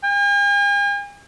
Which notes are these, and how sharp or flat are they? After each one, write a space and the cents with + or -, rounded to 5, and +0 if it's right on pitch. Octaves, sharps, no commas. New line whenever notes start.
G#5 -45